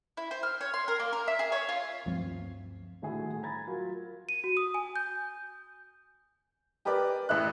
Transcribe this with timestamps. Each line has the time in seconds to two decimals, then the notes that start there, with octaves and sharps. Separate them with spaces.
0.17 E4
0.31 C5
0.43 F6
0.61 C#5
0.74 C6
0.88 A#4
1.00 A#3
1.13 A#4
1.28 E5
1.39 G#4
1.52 C#5
1.69 F4
2.06 D2 G2 F3 C4
3.02 D#1 A2 D3 E4 F#4 G#4
3.43 A#5 B5 G#6 A6
3.67 F#3 F4 A#4
4.29 D#7
4.44 F#4
4.57 D#6
4.74 G#5
4.96 G6
6.85 G4 A#4 B4 D5
7.29 A1 E5 F#6